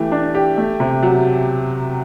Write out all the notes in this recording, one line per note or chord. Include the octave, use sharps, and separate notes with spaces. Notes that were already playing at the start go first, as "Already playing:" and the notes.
Already playing: E3 A3 G4
D4
G4
A3
C3
F#3